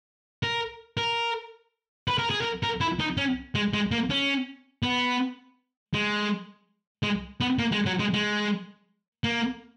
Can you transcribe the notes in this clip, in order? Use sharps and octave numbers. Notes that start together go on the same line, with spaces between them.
A#4
A#4
B4
A#4
G#4
A#4
A#4
E4
D#4
C#4
G#3
G#3
A#3
C#4
B3
G#3
G#3
B3
A#3
G#3
F#3
G#3
G#3
A#3